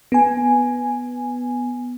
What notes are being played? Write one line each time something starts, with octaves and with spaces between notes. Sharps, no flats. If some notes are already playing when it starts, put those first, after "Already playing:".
B3 G#5